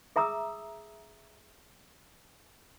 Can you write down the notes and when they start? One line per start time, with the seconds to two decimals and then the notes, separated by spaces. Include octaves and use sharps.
0.16 G#4 E5 A#5 D#6 E6